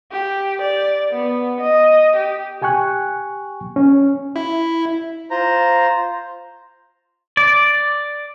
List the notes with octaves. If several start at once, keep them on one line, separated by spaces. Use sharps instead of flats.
G4
D5
B3
D#5
G4
G4 G5 G#5 C#6 F#6
C#4
E4
F4 C5 A#5
D5